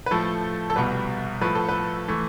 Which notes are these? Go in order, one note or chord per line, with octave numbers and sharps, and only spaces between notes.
B4
A2 F3 A3 A4
A4
C2 B2 G3 B4
A2 F3 A3 B4
A4
B4
E3 A3